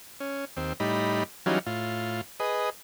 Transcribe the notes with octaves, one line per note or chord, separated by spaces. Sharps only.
C#4
D#2 C4
A2 G3 D#4 B5
E3 F#3 G3 C#4 D#4 F4
A2 F4
G#4 B4 D#5